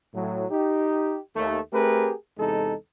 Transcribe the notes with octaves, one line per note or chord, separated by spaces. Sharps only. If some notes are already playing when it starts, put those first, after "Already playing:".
A2 F#3
D#4 G4
D#2 A3
A3 C4 G4 G#4 A#4 B4
E2 C3 G#3 D#4 A4